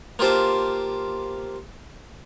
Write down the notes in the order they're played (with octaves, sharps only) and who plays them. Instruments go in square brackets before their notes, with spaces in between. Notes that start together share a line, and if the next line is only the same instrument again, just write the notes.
[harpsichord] A#3 F4 G4 C5 A5